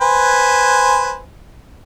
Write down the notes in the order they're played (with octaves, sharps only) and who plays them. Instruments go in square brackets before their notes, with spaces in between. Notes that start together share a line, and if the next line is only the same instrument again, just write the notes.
[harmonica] B4 C5 G#5